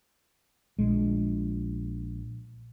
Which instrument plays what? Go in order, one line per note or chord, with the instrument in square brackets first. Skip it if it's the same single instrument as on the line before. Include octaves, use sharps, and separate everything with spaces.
[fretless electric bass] A#1 G#3